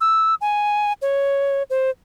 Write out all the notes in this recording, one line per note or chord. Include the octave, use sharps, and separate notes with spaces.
E6
G#5
C#5
C5